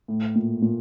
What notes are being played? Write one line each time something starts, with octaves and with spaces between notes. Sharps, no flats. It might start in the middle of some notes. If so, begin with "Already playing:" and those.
A2
A#2
A#2